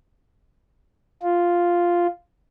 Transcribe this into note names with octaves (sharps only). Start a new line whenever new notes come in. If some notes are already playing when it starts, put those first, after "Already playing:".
F4